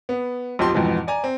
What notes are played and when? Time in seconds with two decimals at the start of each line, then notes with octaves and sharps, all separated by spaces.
0.09 B3
0.59 B1 F2 F3 G4 C6
0.74 F2 G#2 B2 E3
1.07 D5 G#5 A#5
1.24 C4